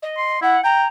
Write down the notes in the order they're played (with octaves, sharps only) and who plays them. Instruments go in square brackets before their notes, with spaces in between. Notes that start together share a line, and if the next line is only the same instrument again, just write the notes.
[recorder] D#5
[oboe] C6
[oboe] E4 [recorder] F#5
[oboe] G5 [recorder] A#5